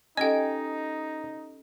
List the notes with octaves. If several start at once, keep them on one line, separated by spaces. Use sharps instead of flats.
C#4 D#4 G4 A4 D#5 G5 G#5